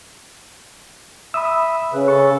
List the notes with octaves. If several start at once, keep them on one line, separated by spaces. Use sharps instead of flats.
E5 B5 D#6 E6
C#3 B4
A4 C#6